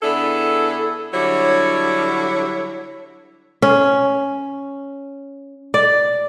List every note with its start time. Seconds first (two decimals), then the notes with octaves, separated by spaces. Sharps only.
0.03 D3 B3 D4 E4 G#4 A4
1.14 D3 F#3 G3 E4 C#5
3.62 C#4
5.74 D5